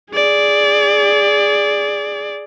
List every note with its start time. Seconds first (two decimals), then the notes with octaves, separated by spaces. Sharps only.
0.12 G#4 D5